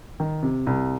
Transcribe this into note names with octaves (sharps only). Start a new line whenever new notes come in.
D#3
C3
C2